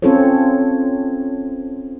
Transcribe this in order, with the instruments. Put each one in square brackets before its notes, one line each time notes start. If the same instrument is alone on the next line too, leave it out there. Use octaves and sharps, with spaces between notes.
[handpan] C4 C#4 F4 A4 C5 C#5